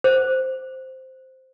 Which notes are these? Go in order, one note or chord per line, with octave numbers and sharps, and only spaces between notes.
C5